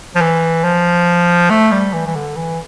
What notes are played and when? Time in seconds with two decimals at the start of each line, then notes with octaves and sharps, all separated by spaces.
0.15 F3
0.21 E3
0.64 F3
1.50 A3
1.71 G3
1.93 E3
2.06 E3
2.15 D3
2.36 E3